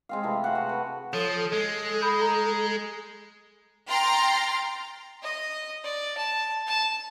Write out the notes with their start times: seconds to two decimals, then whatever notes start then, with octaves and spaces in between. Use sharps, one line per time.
0.09 G#3 C4 F5
0.23 C3 E3 A3
0.44 F#4 F5 F#5
0.55 F#4
0.69 B4
1.13 F3 A4 C#5 D#6
1.52 G#3 A4
2.02 B5 D#6 G6
2.22 A#5
3.88 G5 A#5 C6 F6 A6
5.23 D#5
5.84 D5
6.17 A5
6.66 A5